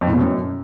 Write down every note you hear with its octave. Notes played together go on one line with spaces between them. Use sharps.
F2
A2
B2
F#2